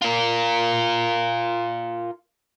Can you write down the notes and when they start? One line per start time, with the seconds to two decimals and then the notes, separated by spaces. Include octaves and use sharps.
0.02 F4 A#4